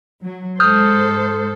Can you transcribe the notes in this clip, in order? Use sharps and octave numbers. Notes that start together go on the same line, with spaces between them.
F#3
G#2 A4 C5 D#6 F6 G6